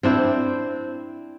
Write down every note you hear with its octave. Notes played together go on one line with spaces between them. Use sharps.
C4 D4 E4 C5